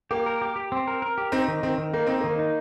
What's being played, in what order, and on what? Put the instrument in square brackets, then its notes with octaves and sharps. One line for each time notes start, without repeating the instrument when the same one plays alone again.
[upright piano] A#3 [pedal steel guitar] G4
[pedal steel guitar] A#4
G4
G4
C4
A#4
A#4
G4
[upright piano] C4 [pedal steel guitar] D#4
[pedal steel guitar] D#3
[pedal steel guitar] D#3 [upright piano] C4
[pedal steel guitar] D#3
[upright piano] A#3 [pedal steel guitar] D#4
[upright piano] C4 [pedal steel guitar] D#4
[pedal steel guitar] D#3 [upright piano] A#3
[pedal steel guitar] D#4